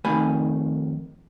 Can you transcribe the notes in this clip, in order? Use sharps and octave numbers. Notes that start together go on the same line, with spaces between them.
F2 D#3 A3 G#5 B5